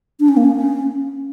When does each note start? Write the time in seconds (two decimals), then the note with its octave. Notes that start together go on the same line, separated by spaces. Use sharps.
0.20 D4
0.28 C#4
0.37 A#3
0.45 C#4
0.56 C#4